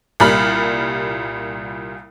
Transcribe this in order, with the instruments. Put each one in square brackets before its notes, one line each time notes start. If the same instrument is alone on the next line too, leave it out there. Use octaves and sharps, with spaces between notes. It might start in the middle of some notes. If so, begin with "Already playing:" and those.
[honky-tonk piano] C2 A#2 G3 B5 F6